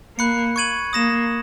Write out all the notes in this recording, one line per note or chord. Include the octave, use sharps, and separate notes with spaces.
A#3 B5 F#6 C#7
C#6 G#6 D#7 F#7
A#3 D#6 A#6 E7